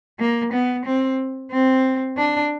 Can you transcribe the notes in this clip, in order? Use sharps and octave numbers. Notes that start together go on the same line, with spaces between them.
A#3
B3
C4
C4
D4